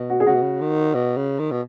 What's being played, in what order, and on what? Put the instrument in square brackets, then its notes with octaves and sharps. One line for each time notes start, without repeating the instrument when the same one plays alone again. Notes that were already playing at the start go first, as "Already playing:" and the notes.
Already playing: [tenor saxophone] B2
[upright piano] F#4
G#4
[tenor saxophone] C#3 [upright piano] F#4
[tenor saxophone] B2
C#3
D#3
B2
C#3
D#3
B2